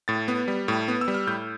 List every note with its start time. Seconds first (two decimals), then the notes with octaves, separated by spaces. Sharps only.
0.08 A2 A6
0.28 B3
0.48 G3
0.68 A2
0.88 B3
1.01 E6
1.08 G3
1.14 F6
1.27 A2 G6